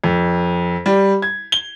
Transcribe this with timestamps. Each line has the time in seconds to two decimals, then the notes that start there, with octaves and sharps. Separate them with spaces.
0.04 F2
0.86 G3
1.22 G#6
1.52 G7